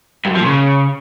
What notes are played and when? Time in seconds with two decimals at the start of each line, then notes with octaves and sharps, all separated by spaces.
0.25 G2
0.30 F#2
0.35 F3
0.40 A#2
0.46 C#3